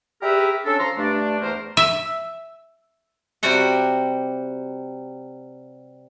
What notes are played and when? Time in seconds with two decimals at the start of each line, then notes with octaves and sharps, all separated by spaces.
0.22 G4 G#4 A#4 B4 E5
0.65 C#4 D4 A4
0.78 F3 F4 A#5 C6
0.97 G2 A3 D4
1.39 E2 A3 A#4 C5
1.77 E5
3.43 C3 G3 F#4 F#5